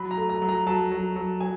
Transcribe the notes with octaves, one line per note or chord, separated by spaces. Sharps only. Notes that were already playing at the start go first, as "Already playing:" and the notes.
Already playing: F#3 B5
A#5
A3
A#5
F#3
A#5
F#3 A5
F#3
F#3
F#3 G#5